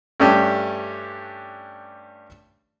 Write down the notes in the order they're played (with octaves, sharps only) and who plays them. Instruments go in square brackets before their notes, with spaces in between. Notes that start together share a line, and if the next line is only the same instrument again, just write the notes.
[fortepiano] G2 A3 C#4 D4 G4